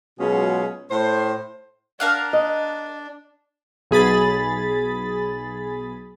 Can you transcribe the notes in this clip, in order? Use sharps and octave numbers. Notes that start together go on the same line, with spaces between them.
B2 F#3 G#3 C#4 F4 G#4
A2 C5
D4 A#4 F5 F#5
D#5
B1 G#4 B5 A6